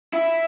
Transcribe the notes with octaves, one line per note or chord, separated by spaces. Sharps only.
E4